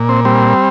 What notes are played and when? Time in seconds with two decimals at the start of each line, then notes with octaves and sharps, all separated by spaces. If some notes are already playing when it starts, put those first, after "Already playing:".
Already playing: A#2
0.09 C4
0.25 G3 C4